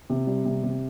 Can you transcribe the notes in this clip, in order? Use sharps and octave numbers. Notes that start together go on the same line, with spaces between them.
C3
G3
C3
C3